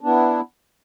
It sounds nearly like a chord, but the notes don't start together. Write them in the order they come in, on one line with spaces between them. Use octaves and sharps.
D4 B3 E4